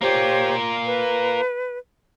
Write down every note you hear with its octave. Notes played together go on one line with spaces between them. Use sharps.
A#3 F4 G4 C5 C#5
B4